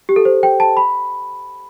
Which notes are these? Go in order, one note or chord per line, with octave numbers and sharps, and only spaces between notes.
G4
A4
C5
G5
A5
B5